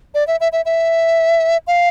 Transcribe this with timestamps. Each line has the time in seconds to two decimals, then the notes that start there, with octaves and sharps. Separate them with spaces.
0.14 D5
0.27 E5
0.40 E5
0.52 E5
0.65 E5
1.67 F5